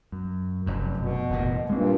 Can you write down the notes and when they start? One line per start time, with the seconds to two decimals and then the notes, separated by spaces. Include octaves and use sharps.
0.12 F#2
0.66 F1 F#2
0.97 B2
1.30 F1 E2 A#2
1.69 G2 A#2 G#3 C4